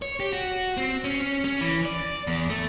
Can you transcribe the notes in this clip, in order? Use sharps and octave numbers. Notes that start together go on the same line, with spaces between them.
C#5
G4
F#4
C4
C#4
C#4
E3
D5
E2
A3